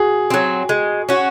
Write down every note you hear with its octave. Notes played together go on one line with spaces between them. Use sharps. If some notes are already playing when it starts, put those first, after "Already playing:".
Already playing: F#4 G#4
F#3 C4
G#3
C#4 F#4